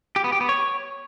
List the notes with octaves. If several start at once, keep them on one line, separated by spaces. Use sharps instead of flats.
G4
B3
G4
B3
C#5